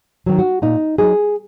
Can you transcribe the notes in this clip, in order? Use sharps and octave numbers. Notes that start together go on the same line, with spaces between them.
D#3 F#3
F#4
A#2 D#4
F#3 D#4 G#4